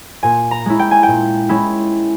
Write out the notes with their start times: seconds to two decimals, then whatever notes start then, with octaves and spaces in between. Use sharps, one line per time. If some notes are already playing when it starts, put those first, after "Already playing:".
0.23 A#2 G#5
0.51 A#5
0.66 G#3 C#4 E4
0.79 G5
0.91 G#5
1.03 A#2 G5
1.49 G#3 C#4 E4